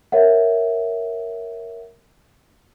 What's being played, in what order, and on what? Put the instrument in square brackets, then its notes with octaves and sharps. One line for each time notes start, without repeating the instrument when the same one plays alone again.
[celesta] A#4 C#5 E5 F#5